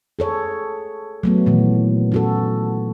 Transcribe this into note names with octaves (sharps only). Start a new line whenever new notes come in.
G#4 A4 C#5
F#3 A3 B3
A#2 D#3 E3
C#4 F#4 A4